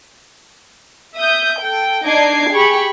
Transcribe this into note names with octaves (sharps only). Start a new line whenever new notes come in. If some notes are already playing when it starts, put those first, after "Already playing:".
E5 D#6 G6
A4 G5
D4 D#4 D#5 D6 G#6 C7
G4 G#4 B5 C#6